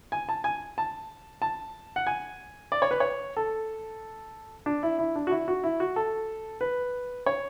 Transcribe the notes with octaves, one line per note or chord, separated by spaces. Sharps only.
G#5
A5
G#5
A5
A5
F#5
G#5
D5
C#5
B4
C#5
A4
D4
E4
E4
D4
F#4
E4
F#4
E4
F#4
A4
B4
C#5